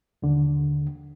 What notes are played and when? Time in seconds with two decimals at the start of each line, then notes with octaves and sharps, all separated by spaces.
0.22 D#2 D3